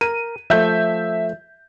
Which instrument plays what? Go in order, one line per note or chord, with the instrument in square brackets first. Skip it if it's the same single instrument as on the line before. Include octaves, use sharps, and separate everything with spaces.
[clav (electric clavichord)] A#4 [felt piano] D#7
[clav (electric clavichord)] F3 A3 [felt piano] E5 G6